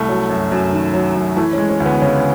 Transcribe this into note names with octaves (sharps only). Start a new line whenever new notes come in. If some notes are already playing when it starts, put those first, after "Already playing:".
Already playing: C2 A3
F#3
F#2
F#2
D#3
F#3
F#2
E3 A3
C#4
G#3
C#4
D2
B3
C#3 C#4